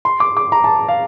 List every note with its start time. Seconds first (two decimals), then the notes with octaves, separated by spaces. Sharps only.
0.05 C6
0.20 D6
0.37 D6
0.52 A#5
0.64 A5
0.89 F5